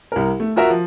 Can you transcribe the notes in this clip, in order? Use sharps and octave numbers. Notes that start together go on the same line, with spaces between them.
C2 A#4
A3
F4 F#4 A#4 E5
F3